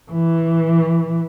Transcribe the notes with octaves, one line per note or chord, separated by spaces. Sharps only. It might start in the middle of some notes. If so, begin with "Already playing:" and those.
E3